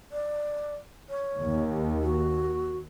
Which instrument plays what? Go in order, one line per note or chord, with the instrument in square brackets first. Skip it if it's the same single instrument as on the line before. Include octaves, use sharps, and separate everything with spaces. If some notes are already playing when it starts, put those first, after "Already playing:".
[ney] D5
C#5
[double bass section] D#2
[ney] F#4